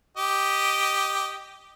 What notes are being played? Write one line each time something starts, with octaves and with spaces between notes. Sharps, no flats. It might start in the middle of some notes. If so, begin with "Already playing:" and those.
G4 D#5